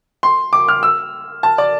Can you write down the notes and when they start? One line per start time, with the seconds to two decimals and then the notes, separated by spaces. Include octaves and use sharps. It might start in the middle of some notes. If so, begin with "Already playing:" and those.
0.23 C6
0.53 D6
0.68 F6
0.83 E6
1.43 A5
1.58 D5